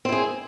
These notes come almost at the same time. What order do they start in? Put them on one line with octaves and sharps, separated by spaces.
C4 E4 G#4